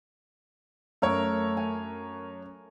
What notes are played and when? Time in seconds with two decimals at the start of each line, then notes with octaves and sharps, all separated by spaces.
1.02 F#2 A3 A#4 C#5
1.57 G#5